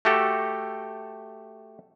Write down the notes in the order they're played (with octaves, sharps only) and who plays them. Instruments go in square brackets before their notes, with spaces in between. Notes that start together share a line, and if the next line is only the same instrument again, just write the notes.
[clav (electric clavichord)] A3 F#4 G4 A4